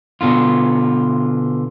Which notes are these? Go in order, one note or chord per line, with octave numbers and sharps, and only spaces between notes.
B2 D3 F4